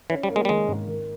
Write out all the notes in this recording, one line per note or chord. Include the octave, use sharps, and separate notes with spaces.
E3 C#4
G3
A#3
G#3
G3
D#3 G#3
G#2
D#3